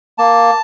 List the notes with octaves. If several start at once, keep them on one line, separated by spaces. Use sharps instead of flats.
A#3 A5